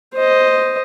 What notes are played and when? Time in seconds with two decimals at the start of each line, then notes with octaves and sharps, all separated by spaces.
0.14 C5 D#5